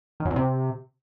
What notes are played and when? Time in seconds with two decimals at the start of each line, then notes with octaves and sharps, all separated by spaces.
0.20 D#3
0.25 F#2
0.31 E2
0.36 C3